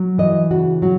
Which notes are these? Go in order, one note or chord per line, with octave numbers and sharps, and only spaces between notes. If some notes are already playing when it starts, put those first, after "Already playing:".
Already playing: F#3
E3 D#5
C#3 F#4
F#3 F#4